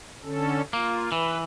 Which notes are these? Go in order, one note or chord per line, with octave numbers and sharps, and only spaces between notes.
D3 C#4 A4
A#3 F4
E3 B4